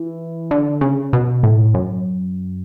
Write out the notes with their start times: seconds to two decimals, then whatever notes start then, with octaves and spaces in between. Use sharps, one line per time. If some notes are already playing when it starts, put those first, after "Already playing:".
Already playing: E3
0.51 D3
0.81 C#3
1.13 B2
1.43 A2
1.74 F#2